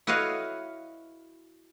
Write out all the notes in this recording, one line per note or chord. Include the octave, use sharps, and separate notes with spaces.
E4 F#4 B4 C#5 D#5 F5